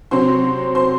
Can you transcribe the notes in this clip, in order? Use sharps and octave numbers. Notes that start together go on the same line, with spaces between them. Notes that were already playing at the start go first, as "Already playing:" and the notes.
C3 F#3 C4 C5 C6
C5 C6